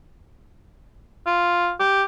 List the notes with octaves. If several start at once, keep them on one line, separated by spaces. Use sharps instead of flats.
F4
G4